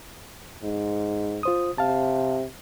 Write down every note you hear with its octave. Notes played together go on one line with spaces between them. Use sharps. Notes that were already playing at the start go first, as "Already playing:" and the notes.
G#2
F4 C5 D#6
C3 F5 A5